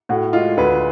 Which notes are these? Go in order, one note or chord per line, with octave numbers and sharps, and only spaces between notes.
A2 F#4
G#3 F4
D2 B4